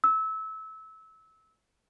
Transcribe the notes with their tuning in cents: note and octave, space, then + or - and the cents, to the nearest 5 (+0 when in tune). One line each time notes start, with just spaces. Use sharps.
E6 -25